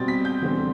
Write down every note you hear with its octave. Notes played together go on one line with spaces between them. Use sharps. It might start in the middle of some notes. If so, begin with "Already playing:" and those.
Already playing: B2 G3 C4 A6
B6
G6
E2 D3 G3 C4